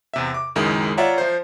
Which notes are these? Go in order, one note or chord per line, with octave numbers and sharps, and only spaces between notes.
E2 C3 E5
D6
C#2 F#2 D#3 G#3 E4
F4 C#5 D5 E5 F#5 A#5
F3 C5